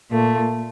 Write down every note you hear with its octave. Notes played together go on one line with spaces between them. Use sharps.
A#2 A3